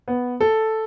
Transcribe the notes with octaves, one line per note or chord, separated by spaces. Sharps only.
B3
A4